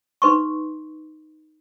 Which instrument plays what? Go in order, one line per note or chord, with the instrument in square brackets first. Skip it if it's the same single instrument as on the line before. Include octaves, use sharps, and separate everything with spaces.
[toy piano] D#4 B4 C6 C#6